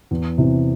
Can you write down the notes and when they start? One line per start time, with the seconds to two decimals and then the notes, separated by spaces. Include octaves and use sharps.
0.11 E2
0.38 C3 E3